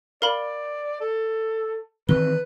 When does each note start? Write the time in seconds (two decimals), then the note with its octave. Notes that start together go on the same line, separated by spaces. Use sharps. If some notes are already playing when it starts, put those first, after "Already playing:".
0.22 A#4 D5 F5 B5
1.00 A4
2.09 D#3 E3 C4 B4 G7